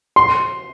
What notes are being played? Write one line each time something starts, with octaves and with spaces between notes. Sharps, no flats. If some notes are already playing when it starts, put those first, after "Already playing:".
C6